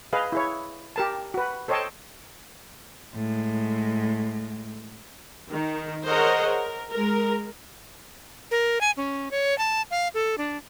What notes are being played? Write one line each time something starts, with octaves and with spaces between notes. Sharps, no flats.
G#4 B4 D#5 F5
E4 G#4 C#5
G4 A#4 A5
F#4 B4
A4 C5 C#5 D#5 G5 A5
A2 G#3
D#3
G#4 A#4 C5 C#5 D#5 F#5
A#4
G#3 A#4
A#4
G#5
C#4
C#5
A5
F5
A4
D4